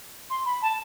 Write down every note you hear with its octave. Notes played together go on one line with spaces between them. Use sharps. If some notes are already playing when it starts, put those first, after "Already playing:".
C6
B5
A5